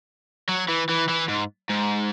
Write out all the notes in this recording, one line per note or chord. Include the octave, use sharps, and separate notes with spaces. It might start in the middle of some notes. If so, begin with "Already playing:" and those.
F#3
E3
E3
E3
G#2
G#2